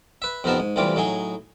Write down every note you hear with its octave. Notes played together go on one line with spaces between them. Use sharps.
B4 E5
F2 C3 D#3 B3 A#4 A5
G#2
D2 C3 E3 G3 F4 D6
A2 F#3 D#4 G#4